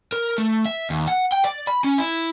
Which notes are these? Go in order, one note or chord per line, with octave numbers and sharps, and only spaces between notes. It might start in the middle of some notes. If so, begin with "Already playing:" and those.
A#4
A3
E5
D#2
F#5
G5
D5
B5
C#4
E4